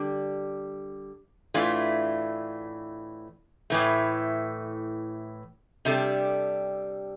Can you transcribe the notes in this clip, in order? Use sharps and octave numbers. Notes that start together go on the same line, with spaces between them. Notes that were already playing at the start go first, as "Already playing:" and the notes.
Already playing: D3 G3 D4
A2 E3 A3 D4 F4
A2 E3 A3
C3 G3 D4 A4